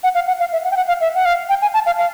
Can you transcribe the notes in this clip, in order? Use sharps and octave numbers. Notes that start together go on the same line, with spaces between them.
F#5
F5
F#5
F5
E5
F#5
G5
F#5
F5
E5
F#5
F5
G5
G#5
A5
F5
F5